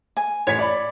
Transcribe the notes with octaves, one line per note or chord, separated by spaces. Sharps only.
G#5
A1 C#5 B6
D5 B5